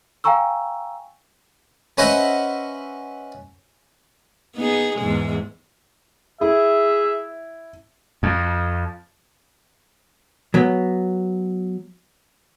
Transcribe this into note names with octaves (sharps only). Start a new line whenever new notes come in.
F5 G5 G#5 A#5 C#6 E6
C#4 B4 C5 D#5 E5 F#5
B3 D#4 G#4
E2 G#2 G#3
E4 G#4 E5
F2
F#3 B3